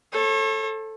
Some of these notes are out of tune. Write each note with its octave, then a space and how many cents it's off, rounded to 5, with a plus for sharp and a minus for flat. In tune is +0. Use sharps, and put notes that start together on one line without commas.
A4 +0 C#5 -40